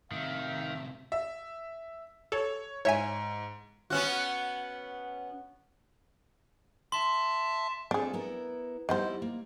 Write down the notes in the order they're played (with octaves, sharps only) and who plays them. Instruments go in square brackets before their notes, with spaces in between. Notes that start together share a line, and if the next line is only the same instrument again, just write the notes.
[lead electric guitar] A2 C3 [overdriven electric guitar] D#3 [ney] E5 [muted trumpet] F5
[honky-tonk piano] E5
[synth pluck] A4 [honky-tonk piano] C#5
[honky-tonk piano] G#2 [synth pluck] C#5 E5 G#5
[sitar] B3 C#4 F#4
[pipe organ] E5 A5 [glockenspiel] C6
[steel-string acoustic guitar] C4 F4 A4 [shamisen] D4 G#4
[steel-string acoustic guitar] B3 E4 A#4
[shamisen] D#3 B3 C5 [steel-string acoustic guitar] G3 E4 D#5
[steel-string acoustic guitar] A#3